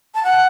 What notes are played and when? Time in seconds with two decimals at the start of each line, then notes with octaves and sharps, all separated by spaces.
0.15 A5
0.24 F#5